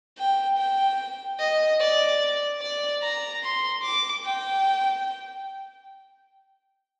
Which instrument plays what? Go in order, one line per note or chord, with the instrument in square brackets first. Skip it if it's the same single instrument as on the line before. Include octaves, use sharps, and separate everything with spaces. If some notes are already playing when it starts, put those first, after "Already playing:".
[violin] G5
G5
D#5
D5
D5
A#5
C6
D6
G5